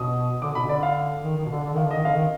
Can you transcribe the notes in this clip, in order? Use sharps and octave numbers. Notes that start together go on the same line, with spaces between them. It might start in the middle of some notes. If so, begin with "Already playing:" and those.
Already playing: B2 D#6
D3 D6
B2 B5
D3 D5
F5
D#3
D#3
B2
D3
D3
D#3 F5
D3
D#3 D#5
D3 F5
D#3